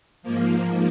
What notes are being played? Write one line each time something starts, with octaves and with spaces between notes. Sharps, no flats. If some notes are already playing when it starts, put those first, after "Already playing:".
G#2 F3 A#3